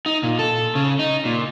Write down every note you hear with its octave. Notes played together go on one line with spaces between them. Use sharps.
D#4
A#2
A4
C#3
D#4
A#2